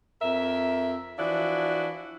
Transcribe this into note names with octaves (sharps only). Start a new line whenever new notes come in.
F2 A#4 E5
E3 F3 D4 E4 F#4